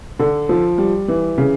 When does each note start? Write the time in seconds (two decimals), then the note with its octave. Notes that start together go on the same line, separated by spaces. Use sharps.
0.19 D3
0.49 F3
0.78 G3
1.08 E3
1.38 C#3